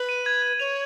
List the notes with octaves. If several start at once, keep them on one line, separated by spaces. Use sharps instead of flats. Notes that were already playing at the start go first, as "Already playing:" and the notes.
Already playing: B4 F#7
D#7
G#6
G#6
C#5 F7